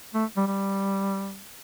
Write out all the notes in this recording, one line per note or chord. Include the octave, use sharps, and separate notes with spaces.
A3
G3
G3